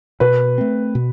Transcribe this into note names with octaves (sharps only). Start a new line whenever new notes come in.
B2 B4
A3 C4
B2